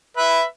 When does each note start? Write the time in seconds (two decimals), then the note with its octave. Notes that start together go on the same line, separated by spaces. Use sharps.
0.17 B4 E5